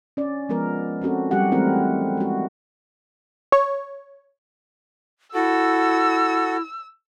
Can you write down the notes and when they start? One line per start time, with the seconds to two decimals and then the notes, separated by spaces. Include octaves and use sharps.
0.17 C#4 D5
0.49 F3 G#3 B3 A#4
1.01 C4 C#4 F#4 A4
1.31 F#3 G3 F#4 G4 F#5
1.52 E3 G#3 A3 C4 E4 A#4
2.17 G#3 F#4
3.52 C#5
5.34 E4 F#4 A4 E6